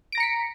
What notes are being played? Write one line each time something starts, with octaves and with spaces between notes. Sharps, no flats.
A#5 A#6 B6 C#7 D7